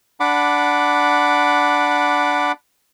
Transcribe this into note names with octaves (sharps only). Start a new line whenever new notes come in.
D4 F#5 B5 D6